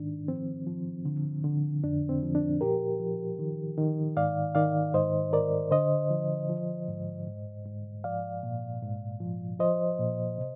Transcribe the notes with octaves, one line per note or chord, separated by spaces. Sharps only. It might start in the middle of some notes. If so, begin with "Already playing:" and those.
Already playing: G#2 D#3 D4
F3 C4
F3
D3
D3
F2 D4
C4
F3
D4
A#2 G4 A#4
F3
D#3
D#3
G#2 D5 F5
D#3 D5 F5
G#2 C5 D#5
G#2 A#4 D5
D3 C5 D#5
F3
F3
G#2
G#2
G#2
F3 D5 F5
A#2
G#2
F3
F3 C5 D#5
A#2
C3